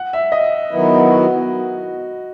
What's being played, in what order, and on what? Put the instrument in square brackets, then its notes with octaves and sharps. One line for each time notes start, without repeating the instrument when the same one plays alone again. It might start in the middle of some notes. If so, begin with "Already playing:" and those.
Already playing: [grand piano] F#5
E5
D#5
[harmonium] D#3 F#3 B3 E4
[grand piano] F#4